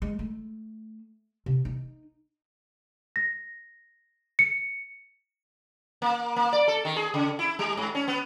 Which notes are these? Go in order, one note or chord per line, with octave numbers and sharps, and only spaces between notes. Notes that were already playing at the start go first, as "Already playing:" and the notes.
G#3
A3
C3
D#4
A#6
C#7
A#3
A#3
D5
A4
D#3
G#4
C#3
E4
G3
G#2
C#4
B3